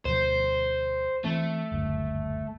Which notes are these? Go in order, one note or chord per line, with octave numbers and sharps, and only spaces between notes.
D2 B2 F3 C5
E3 A3 C4
F#1 D2 G2